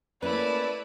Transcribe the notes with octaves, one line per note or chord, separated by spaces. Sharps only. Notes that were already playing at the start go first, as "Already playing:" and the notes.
A3 A#3 C#4 E4 B4 D5